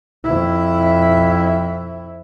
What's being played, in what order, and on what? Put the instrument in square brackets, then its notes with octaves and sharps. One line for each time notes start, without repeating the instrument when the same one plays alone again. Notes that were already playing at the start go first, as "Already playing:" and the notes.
[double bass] F2 E4